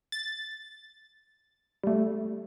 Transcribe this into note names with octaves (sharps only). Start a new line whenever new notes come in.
A6
G3 A3